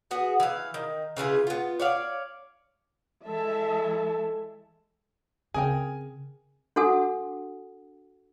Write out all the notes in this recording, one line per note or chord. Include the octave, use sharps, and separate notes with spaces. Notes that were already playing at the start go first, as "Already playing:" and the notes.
B3 F#4 G#4
E3 F5
D#3
C#3 E3 F4 G#4
B3 F4
C#5 D5 F5
E3 G#3 A4 E5 A5
C#3 C4 G#4 A#4 G5 G#5
D4 F#4 A4 F#5 G#5 D#6